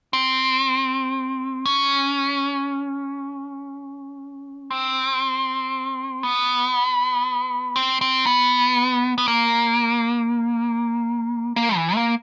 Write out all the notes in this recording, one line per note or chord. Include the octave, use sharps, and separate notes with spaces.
C4
C#4
C4
B3
C4
C4
B3
B3
A#3
A#3
E3
A#3